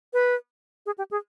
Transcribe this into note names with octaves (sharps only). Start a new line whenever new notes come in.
B4
G#4
G4
G#4